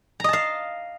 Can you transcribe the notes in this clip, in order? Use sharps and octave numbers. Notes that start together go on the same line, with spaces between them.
D#5 F5 A5 A#5